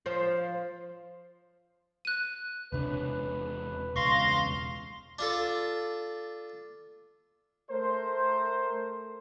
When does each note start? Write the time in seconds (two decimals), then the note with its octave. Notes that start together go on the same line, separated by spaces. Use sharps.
0.06 F3 C5
2.05 F#6 D#7
2.72 E1 C3 D4 B4
3.96 E1 C#2 F5 C6 C#6 A#6
5.19 D4 F4 A4
7.70 A3 A#4 C5